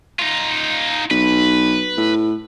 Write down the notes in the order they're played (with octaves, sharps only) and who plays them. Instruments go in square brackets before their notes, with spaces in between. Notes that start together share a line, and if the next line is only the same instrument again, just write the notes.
[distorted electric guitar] D#4 F4
[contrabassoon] B1 [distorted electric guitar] B4
[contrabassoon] A2